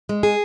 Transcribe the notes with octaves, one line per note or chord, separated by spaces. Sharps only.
G#3
G#4